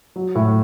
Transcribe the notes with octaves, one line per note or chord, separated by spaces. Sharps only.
F#3
A2